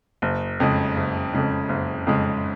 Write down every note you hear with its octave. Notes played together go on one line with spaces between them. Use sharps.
F#1
F2 C#3 G#3
F#1
F2 C#3 G#3
F#1
F2 C#3 G#3